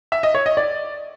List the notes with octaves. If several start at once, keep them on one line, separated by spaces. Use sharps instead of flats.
E5
D#5
C#5
D#5
D5